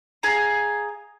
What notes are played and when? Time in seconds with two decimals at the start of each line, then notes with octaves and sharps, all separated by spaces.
0.23 G#4 F5 A#5